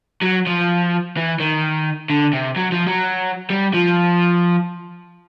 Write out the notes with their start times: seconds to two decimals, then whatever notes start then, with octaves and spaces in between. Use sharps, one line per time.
0.23 F#3
0.47 F3
1.17 E3
1.40 D#3
2.10 D3
2.33 C3
2.56 F#3
2.72 F3
2.87 F#3
3.50 G3
3.73 F3